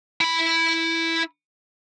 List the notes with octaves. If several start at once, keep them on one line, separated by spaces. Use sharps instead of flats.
E4 B5